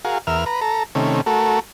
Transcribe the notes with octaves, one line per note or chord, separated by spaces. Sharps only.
F#4 G#4 A#4 F5
E2 A#4 E5 F6
B4 A#5
A4 A#5
C3 D#3 A3 C#4
A3 F#4 A4 A#4